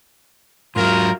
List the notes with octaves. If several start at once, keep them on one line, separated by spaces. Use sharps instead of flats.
G#2 F#3 F4 A#4